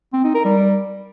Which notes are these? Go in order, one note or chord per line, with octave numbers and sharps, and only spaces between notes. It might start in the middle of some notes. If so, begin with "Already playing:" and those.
C4
D#4
A#4
G3